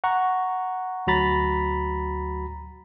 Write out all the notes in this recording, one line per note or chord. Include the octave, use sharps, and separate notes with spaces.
F#5 A#5 C#6
D2 F#3 F#4 A#5 B5 A6